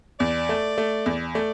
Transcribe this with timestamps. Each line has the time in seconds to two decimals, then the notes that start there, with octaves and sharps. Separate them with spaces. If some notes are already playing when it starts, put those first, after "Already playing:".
0.20 E2 D5
0.49 A3
0.78 A3
1.06 E2
1.35 A3 D5